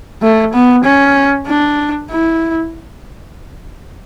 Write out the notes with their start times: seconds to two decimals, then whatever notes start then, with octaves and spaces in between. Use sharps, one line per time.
0.22 A3
0.53 B3
0.84 C#4
1.47 D4
2.10 E4